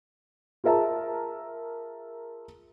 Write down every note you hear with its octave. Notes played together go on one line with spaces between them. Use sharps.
F4 G#4 A#4 E5 A5 A#5